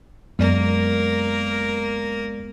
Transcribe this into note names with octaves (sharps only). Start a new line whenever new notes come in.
F#2 G#3 A#3 B3 A#4 D5